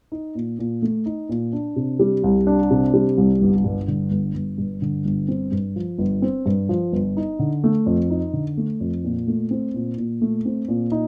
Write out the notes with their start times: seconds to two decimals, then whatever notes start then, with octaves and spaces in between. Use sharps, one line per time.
0.12 D#4
0.35 A#2
0.59 A#2
0.82 A3
1.06 D#4
1.29 A#2
1.53 D4
1.76 C3
1.99 G3
2.24 C2
2.47 D4
2.70 C3
2.94 G3
3.18 C2
3.41 G1
3.64 G2
3.88 D3
4.11 G1
4.34 G1
4.58 G2
4.82 D3
5.05 G1
5.28 C4
5.52 G2
5.76 F3
5.98 G1
6.22 C4
6.46 G2
6.69 F3
6.93 G1
7.17 D#4
7.39 D3
7.64 A3
7.86 F2
8.10 D#4
8.33 D3
8.57 A3
8.80 F2
9.04 A#2
9.28 A3
9.51 C4
9.74 A#2
9.98 A#2
10.21 A3
10.45 C4
10.68 A#2
10.92 D#4